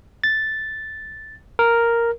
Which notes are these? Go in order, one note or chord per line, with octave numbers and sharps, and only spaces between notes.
A6
A#4